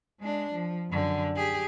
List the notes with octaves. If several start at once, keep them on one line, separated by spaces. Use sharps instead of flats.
G#3 D4
F3
F#2 D3
G4 G#4